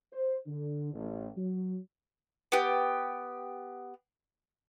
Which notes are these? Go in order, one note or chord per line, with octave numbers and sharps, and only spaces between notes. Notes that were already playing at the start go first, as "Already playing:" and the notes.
C5
D3
A1
F#3
B3 G4